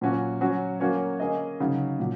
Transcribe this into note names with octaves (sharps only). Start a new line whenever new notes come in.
A#2 F#3 C#4 F#4
F#3 C#4 F#4
F#3 A#3 C#4 F#4 C#5
A#3 C#4 G#4 D#5
C#3 F#3 D#4
A#2 F#3